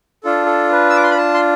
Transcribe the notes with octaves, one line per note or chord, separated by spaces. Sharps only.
D4 F4 A4
A4
B4
E6
D6
C6
B5
A5
C6